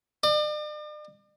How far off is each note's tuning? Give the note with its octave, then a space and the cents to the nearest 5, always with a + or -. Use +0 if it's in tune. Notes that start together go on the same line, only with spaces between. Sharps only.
D5 +45